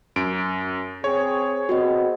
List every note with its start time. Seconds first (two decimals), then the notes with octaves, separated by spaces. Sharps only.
0.16 F#2 D7
1.04 C4 G#4 C#5
1.69 B3 C4 F#4 G#4 D#5